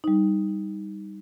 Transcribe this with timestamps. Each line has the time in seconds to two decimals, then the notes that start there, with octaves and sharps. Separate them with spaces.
0.04 G3 D#4